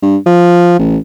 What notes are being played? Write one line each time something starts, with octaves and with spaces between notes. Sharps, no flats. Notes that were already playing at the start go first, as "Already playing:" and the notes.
G2
F3
A1